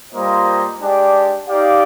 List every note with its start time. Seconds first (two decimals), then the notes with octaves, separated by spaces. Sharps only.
0.12 G3 A#3 F4 C5 D#5
0.80 G#3 D4 G4 D5
1.48 D#4 G4 D5 F5